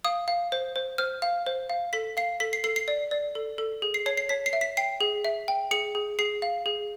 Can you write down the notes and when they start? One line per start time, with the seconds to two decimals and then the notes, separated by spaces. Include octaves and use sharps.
0.05 F5 D#6
0.28 F5
0.52 C5
0.76 C5
0.98 C5 F6
1.22 F5
1.46 C5
1.70 F5
1.93 A4 B6
2.17 F5 C7
2.40 A4 B6
2.53 C7
2.64 A4 C7
2.76 C7
2.88 D5
3.11 D5
3.35 A4
3.58 A4
3.82 G#4
3.94 C7
4.06 C#5 C7
4.17 C7
4.29 C#5 B6
4.46 C7
4.53 E5
4.61 B6
4.77 G5 C7
5.01 G#4
5.25 E5
5.48 G5
5.71 G#4 C#7
5.95 G#4
6.19 G#4 C7
6.42 F5
6.66 G#4